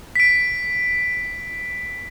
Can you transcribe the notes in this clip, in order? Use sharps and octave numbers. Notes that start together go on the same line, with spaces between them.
B6 D7